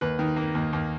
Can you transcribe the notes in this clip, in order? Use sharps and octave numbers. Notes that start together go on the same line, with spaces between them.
D#2 B4
D#3
A#3
D#2
D#2